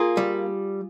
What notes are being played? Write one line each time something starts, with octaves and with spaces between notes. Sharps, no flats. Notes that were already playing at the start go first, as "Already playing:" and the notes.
Already playing: A#3 F4 G#4
G3